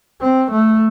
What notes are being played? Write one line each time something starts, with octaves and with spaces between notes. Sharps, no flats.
C4
A3